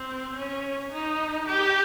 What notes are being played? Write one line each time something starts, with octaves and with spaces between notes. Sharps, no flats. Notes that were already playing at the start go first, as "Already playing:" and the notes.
Already playing: C4
C#4
D#4
G4